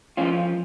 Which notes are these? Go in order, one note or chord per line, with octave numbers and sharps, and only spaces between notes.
F3 C#4 F4